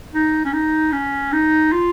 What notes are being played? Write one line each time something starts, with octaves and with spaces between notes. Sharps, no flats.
D#4
C#4
D#4
C#4
D#4
F4